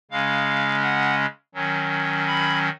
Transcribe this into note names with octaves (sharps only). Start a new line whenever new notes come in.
C#3 G#3 C#4 F5
F#5
D#3 F#3 C#4
B5